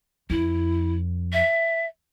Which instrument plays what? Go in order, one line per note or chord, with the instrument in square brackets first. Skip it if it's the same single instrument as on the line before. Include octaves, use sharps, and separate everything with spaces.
[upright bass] F2 [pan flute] E4
[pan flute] E5